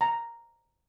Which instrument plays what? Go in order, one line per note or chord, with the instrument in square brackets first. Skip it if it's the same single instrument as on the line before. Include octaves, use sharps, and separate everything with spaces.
[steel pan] A#5